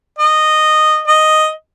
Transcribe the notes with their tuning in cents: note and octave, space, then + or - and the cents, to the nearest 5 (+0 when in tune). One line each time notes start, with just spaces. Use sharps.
D#5 -10
D#5 +0